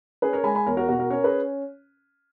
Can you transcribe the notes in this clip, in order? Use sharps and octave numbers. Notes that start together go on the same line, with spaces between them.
C#4 G#4 B4
A#4 C#5
G#3 G#5 B5
G#5 B5
E2 A#4 C#5
F#4 A#4
B2 F#4
F#4 A#4
C#4 A#4 C#5
G#4 B4